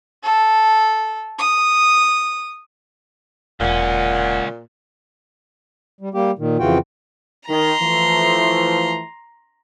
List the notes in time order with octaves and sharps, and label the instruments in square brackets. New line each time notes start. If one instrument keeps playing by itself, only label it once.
[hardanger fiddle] A4
D#6
[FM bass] E1 [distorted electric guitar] C#2 C#4 [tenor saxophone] A#2 [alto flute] F#5
[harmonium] G3
G3 A#3 G4
A#2 D#3
F2 C#3 E3 F4 F#4 G5
[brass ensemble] D#3 [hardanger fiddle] A#5 C6
[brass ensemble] E3 F3 A3